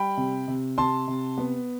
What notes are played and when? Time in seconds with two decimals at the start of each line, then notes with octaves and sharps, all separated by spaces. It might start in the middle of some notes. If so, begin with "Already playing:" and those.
Already playing: G3 G5 B5
0.17 C3
0.48 C3
0.78 C3 A5 C6
1.08 C3
1.38 B3